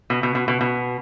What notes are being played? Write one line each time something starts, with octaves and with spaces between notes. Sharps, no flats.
B2
B2
B2
B2
B2